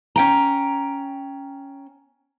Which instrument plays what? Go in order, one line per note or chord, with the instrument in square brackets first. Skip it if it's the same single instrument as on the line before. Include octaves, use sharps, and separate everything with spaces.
[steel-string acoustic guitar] C#4 G5 A#5